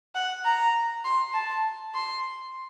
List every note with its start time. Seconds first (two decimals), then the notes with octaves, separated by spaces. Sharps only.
0.15 F#5
0.45 A#5
1.05 C6
1.34 A5
1.94 C6